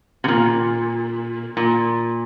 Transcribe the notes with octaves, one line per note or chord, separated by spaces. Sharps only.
C3
A#2
A#2